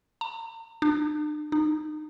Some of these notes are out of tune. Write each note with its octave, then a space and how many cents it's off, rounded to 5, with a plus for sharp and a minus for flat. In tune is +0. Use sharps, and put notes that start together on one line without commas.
A#5 -45
D4 +45
D#4 -25